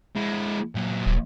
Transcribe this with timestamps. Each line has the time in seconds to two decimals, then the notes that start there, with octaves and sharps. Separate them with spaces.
0.16 G#3 E4
0.75 A#2 F#3
1.06 D1